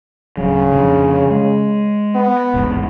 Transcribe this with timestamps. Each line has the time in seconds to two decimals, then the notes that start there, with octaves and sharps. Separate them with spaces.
0.37 D1 C#3 F#3
0.72 F2 A#2 D3
1.30 G#3
2.15 B3
2.54 D#1 A1 G#2